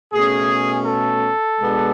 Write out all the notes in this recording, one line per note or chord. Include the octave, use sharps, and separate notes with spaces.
B2 A3 C#4 G#4
A4
B2 G#3 B3 D4